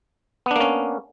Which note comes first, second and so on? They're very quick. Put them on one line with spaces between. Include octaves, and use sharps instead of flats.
B3 D4 A#3 C#4